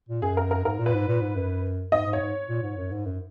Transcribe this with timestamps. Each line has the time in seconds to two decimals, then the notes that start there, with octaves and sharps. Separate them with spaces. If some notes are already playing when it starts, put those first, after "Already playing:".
0.09 A#2
0.22 F#2 G#4
0.37 A#4
0.51 A#4
0.65 G#2 A#4
0.79 A#2
0.86 B4
0.94 G#2
1.08 A#2
1.21 G#2
1.35 F#2
1.92 G#2 D#5
2.06 G#2
2.13 C#5
2.21 G#2
2.49 A#2
2.62 G#2
2.77 F#2
2.91 G#2
3.05 F#2